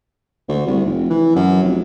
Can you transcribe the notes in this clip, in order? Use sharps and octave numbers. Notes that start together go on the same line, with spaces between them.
D2
C2
F1
E3
F#2
F1